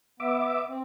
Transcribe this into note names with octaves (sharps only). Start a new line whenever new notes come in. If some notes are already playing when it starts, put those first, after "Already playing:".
B3 E5 D6
C4